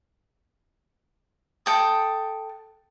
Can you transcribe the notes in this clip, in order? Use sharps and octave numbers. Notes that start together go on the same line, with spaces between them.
A4 G5 D#6